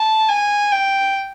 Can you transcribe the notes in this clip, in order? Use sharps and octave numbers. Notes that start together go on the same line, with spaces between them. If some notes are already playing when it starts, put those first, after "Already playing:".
Already playing: A5
G#5
G5